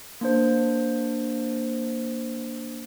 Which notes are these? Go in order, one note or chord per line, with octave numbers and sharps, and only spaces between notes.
A#3 D4 C5